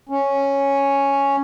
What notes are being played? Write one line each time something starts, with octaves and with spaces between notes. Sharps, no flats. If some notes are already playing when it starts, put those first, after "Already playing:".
C#4